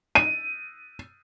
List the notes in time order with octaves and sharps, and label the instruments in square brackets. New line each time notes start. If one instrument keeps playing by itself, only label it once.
[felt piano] D#7